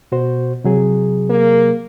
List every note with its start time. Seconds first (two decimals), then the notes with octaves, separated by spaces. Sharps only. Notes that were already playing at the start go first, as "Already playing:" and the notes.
0.12 B2 F#4 C5
0.64 C3 F#3 G#4
1.30 A#3